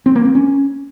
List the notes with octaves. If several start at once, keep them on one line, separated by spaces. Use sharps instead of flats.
C4
A#3
C4
C#4